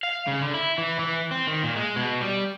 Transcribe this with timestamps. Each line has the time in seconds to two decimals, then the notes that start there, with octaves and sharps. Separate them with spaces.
0.03 F5
0.27 C#3
0.41 D3
0.54 E4
0.78 E3
0.99 E3
1.31 C4
1.47 D#3
1.63 A#2
1.76 G#3
1.96 B2
2.21 G3